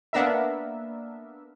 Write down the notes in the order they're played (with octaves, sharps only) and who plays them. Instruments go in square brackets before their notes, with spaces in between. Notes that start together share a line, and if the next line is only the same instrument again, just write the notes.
[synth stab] A#3 B3 D4 A#4 E5